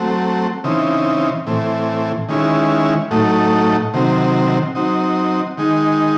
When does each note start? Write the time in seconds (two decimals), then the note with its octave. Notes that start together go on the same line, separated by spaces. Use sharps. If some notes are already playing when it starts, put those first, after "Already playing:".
Already playing: F#3 A3 C4
0.64 C#3 E3 C4 D#4
1.47 A2 E3 C4
2.29 D#3 G#3 C#4 E4
3.11 A2 F#3 A3 D#4
3.94 C3 D#3 F#3 C4
4.75 F#3 C4 D#4
5.57 D#3 G#3 D#4